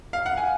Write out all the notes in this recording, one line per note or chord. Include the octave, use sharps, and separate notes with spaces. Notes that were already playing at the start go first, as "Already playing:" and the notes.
F5
F#5
G#5